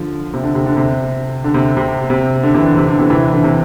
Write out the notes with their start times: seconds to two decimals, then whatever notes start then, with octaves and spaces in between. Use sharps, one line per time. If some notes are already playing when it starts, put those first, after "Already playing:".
Already playing: D3 F3
0.34 C3
0.43 D3
0.55 C3
0.66 D3
0.77 C3
1.44 D3
1.54 C3
1.77 C3
2.10 C3
2.43 D3
2.54 C3 E3
2.66 D3
2.77 C3
2.88 D3
2.99 C3 E3
3.10 C3 E3
3.33 D3
3.44 C3 E3